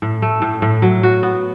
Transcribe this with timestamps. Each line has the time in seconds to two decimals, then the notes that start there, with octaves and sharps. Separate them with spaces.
0.02 A2
0.22 A3
0.42 A2
0.62 A2
0.82 F#3
1.03 F#4
1.23 B3